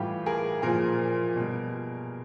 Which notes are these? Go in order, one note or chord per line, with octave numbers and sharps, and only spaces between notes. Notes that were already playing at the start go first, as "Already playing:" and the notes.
Already playing: A2 E3 G3 F4 G4
G#4 A#4
A#2 F3 G#4 A#4
B2 G3